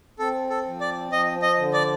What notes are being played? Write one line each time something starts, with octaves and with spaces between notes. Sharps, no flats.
C4 A4
A4
F3
D5
F3 D#5
D#5
D3
D5